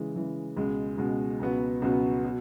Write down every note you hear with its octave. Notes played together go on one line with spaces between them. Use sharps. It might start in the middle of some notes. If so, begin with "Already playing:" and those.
Already playing: C#3 E3 G#3
C#3 E3 G#3
C#2 B2 G#3
C#2 B2 G#3
C#2 B2 F#3 B3 F#4
C#2 B2 F#3 B3 F#4
B2